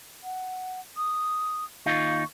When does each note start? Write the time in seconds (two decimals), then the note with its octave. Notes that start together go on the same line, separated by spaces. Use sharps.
0.23 F#5
0.97 D#6
1.86 D#2 D#4 F4 C#6